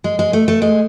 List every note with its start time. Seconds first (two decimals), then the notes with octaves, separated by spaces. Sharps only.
0.04 G#3
0.19 G#3
0.33 A3
0.48 A3
0.62 G#3